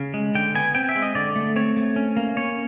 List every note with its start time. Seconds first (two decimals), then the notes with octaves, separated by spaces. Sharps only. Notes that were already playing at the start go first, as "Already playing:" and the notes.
Already playing: C#3 F5
0.14 G#3
0.35 D3 G5
0.55 B3 G#5
0.75 C4 G5
0.89 E5
0.96 G#3
1.02 D#5
1.15 D3 D5
1.36 A3
1.56 C4 C#5
1.77 A3
1.96 C#4
2.17 A#3
2.37 C#4 C#5